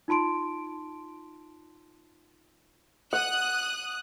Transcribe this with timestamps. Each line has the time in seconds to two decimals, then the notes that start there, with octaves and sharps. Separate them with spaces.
0.08 D#4 F4 A5 C6 D7
3.13 F#5 D#6 F#6